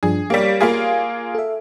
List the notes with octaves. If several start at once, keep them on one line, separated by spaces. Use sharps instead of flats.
G2 F3 D4 G#4
G3 A#3 G4 C#5 D5
A#3 F4 G#4
A4 E5